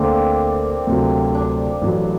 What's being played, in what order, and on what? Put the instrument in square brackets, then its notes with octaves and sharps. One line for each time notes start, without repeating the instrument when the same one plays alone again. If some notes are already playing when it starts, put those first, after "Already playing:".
Already playing: [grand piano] D2 D3 A3 [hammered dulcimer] A#3 C4 D4
[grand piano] D2 C3 F#3
[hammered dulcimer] D4
[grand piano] A1 A2 F#3